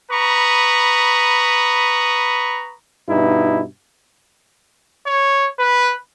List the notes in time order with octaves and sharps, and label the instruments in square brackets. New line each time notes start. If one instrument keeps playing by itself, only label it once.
[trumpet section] B4 A#5 B5 C#6 D#6
[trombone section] G2 B2 D#4 E4
[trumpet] C#5
B4